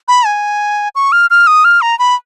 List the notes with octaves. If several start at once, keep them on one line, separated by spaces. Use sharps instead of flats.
B5
G#5
C#6
F6
F6
D#6
F6
A#5
B5